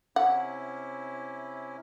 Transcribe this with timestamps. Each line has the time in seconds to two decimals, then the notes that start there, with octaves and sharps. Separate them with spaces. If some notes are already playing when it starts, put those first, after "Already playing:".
0.16 C3 C#4 E4 F#5